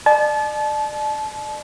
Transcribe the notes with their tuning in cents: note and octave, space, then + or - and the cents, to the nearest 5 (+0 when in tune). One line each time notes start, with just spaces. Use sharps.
D5 +40 A5 -30